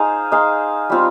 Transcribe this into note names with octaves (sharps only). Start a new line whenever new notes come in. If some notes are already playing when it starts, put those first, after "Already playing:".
Already playing: D#4 G#4 C5 F5
D#4 G#4 C5 F5
G3 C4 F4